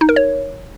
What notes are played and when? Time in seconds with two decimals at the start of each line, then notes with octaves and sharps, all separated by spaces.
0.01 D#4
0.09 A#4
0.16 C#5